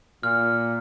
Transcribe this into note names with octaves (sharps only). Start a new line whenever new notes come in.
A#2 F6